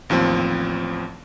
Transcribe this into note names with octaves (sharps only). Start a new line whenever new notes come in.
A1 D#2 F3 C4